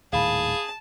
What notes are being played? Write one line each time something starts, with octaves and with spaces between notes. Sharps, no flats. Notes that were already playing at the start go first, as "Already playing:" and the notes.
D#1 A2 D#3 G#4 F5 A5 B5